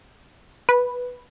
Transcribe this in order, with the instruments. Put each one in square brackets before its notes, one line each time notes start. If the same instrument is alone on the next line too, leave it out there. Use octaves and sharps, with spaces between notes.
[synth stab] B4